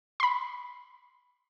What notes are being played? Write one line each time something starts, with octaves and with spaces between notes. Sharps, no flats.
B5 C6